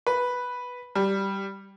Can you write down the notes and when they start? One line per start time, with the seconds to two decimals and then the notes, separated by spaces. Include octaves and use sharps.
0.07 B4
0.95 G3